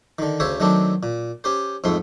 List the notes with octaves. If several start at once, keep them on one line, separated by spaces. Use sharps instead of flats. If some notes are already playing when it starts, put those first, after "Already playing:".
D3 D#3
D2 C#3 C5 C#5 E5
D#3 F#3 A3 C4 D4
A#2
C#4 G4 C5
F2 G#2 A3 C6